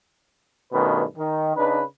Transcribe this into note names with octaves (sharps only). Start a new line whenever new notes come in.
G2 B2 D#3 A3 C#4 B4
D#3
C#3 D4 D#4 B4